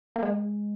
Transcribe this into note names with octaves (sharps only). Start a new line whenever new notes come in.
A#3
G#3